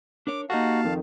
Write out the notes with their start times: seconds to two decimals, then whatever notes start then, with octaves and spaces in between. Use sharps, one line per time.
0.27 D4 A#4 C#5 D6
0.50 A#3 D#4 F#4 G4 A4 F5 A5
0.85 F2 D#3